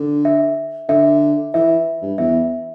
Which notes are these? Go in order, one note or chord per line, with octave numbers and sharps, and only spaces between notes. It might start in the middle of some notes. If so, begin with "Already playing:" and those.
Already playing: D3
E5
D3 E5
E3 E5
G2
E2 E5